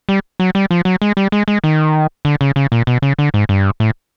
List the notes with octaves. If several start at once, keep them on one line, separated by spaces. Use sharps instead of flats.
G3
F#3
G3
F3
F#3
G#3
G3
G#3
G#3
D#3
D3
C#3
C#3
A#2
B2
C#3
D3
G#2
G2
A2